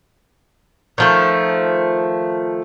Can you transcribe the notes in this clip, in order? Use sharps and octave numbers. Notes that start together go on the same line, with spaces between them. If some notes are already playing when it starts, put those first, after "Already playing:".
D#3 F3 A3